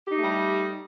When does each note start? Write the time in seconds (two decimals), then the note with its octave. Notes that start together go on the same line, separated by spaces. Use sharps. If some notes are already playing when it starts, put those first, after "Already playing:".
0.06 G4
0.11 D#4
0.16 A3
0.20 G3